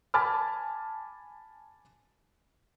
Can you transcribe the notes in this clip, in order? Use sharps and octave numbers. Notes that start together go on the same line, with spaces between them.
G#5 A5 B5 D6 F6